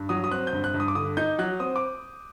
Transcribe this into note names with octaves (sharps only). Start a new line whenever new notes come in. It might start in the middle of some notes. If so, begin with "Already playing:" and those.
Already playing: G2
F#3 D#6
D#6
C4 F#6
G6
G2
F#6
G2
D#6
D6
D3 D#6
D#4 G6
F#3 F#6
C4 D#6
D6